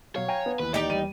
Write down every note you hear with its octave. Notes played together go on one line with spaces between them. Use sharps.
B2 F#3 C#5 F5
F5 G5 G#5 A#5
B3
D#2 E3 B4
D#4 G4 D5
G3 D#7